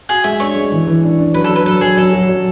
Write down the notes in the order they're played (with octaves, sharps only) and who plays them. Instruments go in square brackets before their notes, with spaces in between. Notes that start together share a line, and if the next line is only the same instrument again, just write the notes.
[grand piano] F#4 [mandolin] G#4
[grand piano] G#3 [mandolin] E5
[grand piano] D4 [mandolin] C#5
[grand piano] G#3
E3
E3
D4
D4
[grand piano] F#3 [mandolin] B4
[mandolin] A4
[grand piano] F#3
[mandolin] B4
[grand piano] F#3 [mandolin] A4
[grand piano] F#3 [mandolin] G#4
[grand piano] F#3 [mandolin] A4
[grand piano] F#3
F#3